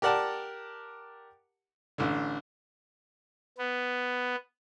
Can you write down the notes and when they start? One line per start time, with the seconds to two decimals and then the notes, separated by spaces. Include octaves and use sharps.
0.02 G4 A#4 D5 F#5 A5
1.98 A1 D3
3.58 B3